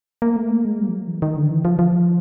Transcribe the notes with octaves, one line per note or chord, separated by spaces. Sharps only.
A#3
A3
A#3
G#3
G3
F3
F#3
E3
D#3
D3
E3
F3
F3